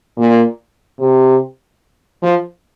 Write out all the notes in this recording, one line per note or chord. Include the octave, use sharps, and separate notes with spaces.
A#2
C3
F3